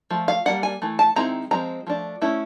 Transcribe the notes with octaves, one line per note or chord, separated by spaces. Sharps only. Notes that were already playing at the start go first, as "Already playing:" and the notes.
F3 A3
F5
G3 A#3 D4 F#5
G#5
E3 A3
A5
D#3 G#3 C4 E4 A#5
F3 G#3 C4 A#5
F3 A3 D4
A3 C#4 E4